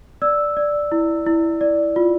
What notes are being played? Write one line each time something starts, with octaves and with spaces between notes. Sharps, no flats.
D5 E6
D5
E4
E4
D5
F4